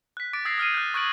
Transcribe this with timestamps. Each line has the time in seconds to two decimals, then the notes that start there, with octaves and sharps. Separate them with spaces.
0.17 F#6 B6
0.33 D6 A6 D7
0.45 D#6 E6 G#6 A#6 C7 D7
0.58 D#6 F6 C7 D#7
0.74 F#6 G6
0.94 C#6 D#6 F#6 G#6 D7 F#7